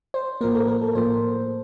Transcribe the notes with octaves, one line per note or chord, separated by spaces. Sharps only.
C5
A2 F3 A#3 A#4
A4
A#4
A4
A2 F3 A#3 C5